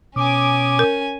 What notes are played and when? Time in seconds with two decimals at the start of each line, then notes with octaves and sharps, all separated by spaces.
0.16 B2 C#4 G#5 D6 D#6
0.79 A#4